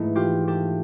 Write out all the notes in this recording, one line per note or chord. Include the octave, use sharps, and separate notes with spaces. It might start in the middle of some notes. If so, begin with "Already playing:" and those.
Already playing: G#2 E3 A3 D#4
F4 G4
G4 A4